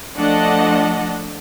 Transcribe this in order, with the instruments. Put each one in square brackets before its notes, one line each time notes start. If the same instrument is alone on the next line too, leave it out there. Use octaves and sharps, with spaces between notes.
[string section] F3 A3 D4 D#5 F#5 A5